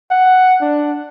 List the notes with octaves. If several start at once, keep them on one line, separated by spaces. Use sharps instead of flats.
F#5
D4